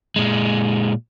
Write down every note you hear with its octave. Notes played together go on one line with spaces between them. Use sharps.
A#2 G#3